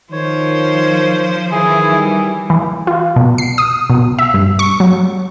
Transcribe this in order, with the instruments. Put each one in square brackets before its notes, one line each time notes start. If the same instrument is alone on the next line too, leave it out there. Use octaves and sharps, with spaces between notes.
[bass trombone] D#3 [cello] F3 [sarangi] C5 [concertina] C#5
[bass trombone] D#3 [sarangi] E3 [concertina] G#4 G#5
[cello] G3
[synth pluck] E3
F4
B2
C7
D#6
B2
E5
G2
C#6
F#3